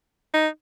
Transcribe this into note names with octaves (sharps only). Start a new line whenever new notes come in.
D#4